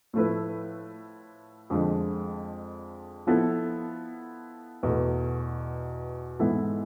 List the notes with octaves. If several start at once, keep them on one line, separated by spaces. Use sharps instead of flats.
A2 F3 A3 E4 B4
F2 D3 F3 G#3
F3 B3 E4 A4
E2 B2 A3
G#2 E3 B3 E4 A4